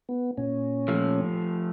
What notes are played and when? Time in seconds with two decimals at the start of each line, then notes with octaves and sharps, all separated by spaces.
0.09 B3
0.38 A#2 C#4
0.88 F3 A3